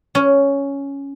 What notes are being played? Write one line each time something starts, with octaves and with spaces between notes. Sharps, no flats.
C#4